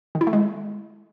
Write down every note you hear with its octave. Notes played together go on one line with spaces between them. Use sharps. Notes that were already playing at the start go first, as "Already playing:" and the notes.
D#3
E4
A3
G#3